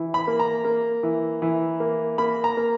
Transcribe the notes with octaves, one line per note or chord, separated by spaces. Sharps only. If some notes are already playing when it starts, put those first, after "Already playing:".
Already playing: E3
B5
A#3
A#5
A#3
E3
E3
A#3
A#3 B5
A#5
A#3